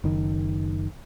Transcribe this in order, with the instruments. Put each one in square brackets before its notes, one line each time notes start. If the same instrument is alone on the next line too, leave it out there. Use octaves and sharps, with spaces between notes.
[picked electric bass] F#1 D#3